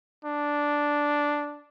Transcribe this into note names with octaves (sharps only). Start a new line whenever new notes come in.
D4